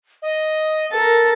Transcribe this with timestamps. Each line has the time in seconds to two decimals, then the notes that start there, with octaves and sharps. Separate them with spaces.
0.22 D#5
0.91 A4 A#4 A6